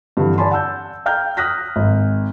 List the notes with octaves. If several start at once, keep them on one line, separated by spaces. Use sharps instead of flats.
G2 D3 E3
D5 G#5 A5 B5 C6
F#5 A5 E6 G6
F5 G5 A#5 F6 G6
D#6 F6 F#6 A#6 B6
G#1